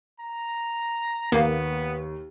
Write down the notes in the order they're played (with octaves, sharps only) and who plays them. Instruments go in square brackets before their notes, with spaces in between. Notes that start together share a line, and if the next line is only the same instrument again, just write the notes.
[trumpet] A#5
[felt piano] D#2 [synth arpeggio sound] A#3 [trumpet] B3